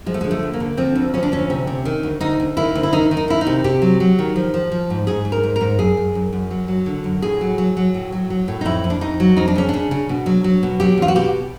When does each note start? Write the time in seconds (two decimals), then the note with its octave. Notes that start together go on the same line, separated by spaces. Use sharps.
0.06 F3 G#3
0.14 A3
0.21 G#3
0.24 D3
0.31 A3
0.43 D2
0.54 A#3
0.60 D3
0.77 F3 C4
0.95 D2
1.14 F3 C#4
1.23 D4
1.32 D2 C#4
1.50 C3
1.67 C3
1.85 D#3
2.03 D2
2.21 D2 D#4
2.40 D2
2.57 D#3 E4
2.75 D2
2.83 E4
2.93 D#3 D#4
3.11 D#3
3.17 D#4
3.28 D#3 E4
3.41 D#4
3.47 C3
3.64 C3 G4
3.82 F#3
4.00 F#3
4.19 D#3
4.36 F3
4.54 F3
4.72 F3
4.90 G#2
5.07 G#2 G#4
5.25 G#2
5.32 A#4
5.43 G#2
5.56 G#2 A#4
5.79 F#2 G#4
5.97 F#2
6.15 F#2
6.33 F#2
6.51 F#3
6.68 F#3
6.86 D3
7.04 F#2
7.22 A2 G#4
7.41 F#3
7.58 F#3
7.77 F#3
7.94 A2
8.12 F#3
8.30 F#3
8.48 A2
8.61 D#4
8.65 F2 E4
8.84 F2
8.90 D4
9.01 F2 D#4
9.20 F#3
9.37 F2 D#4
9.48 D4
9.56 C#3 C#4
9.69 C#3 D4
9.91 C#3
10.09 B2
10.26 F#3
10.44 F#3
10.63 B2
10.80 F#3 G4
10.98 E2 F4
11.08 F#4
11.15 B2 G4